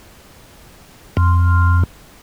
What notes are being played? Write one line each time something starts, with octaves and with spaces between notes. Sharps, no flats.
F2